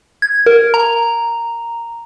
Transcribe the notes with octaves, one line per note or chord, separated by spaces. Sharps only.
G#6
A#4
A#5